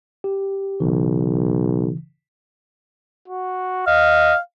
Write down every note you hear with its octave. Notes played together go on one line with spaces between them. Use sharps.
G4
B1 C#3 E3
F#4
D#5 F5